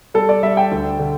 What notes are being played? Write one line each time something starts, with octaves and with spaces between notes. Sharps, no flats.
G3 A4
D5
G3 E5
G5
D2
D3